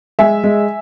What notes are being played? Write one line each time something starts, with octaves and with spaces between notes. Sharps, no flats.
G#3 E5 G#5
G#3